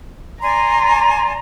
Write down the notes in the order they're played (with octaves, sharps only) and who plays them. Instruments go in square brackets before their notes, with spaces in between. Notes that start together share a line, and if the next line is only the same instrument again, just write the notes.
[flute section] D5 G#5 C6 [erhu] A#5